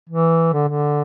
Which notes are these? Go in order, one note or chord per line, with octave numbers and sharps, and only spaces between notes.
E3
D3
D3